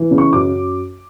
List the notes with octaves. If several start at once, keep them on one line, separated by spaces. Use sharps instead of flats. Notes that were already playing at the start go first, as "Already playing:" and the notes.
Already playing: E3
C#3
C#6
F#2 D6